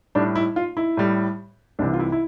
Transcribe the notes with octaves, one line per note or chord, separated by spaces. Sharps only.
A2 G3 D4
E4
F4
E4
A2 G3
C2 C3 E3 D4
F4
E4
E4